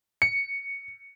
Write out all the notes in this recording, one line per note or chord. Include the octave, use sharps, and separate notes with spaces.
C#7